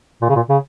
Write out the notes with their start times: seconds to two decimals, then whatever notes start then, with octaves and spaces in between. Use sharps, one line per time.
0.22 A#2
0.29 C#3
0.36 A#2
0.49 C#3